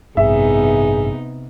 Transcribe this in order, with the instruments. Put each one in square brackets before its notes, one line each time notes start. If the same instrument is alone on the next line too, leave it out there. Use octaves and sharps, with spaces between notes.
[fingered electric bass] A1 G2 [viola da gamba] C3 B3 D#4 [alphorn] G#4 [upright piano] E5